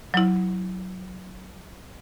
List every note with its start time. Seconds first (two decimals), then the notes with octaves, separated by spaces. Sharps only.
0.14 F#3 E4